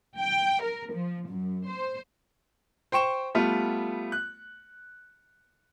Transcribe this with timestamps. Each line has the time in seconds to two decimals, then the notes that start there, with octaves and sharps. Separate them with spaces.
0.19 G5
0.62 A#4
0.93 F3
1.30 F#2
1.69 C5
2.92 C5 G5 C#6 E7
3.35 G3 A3 B3 F4
4.12 F#6